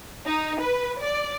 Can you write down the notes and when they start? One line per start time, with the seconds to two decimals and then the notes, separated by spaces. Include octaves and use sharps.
0.25 D#4
0.58 B4
1.00 D5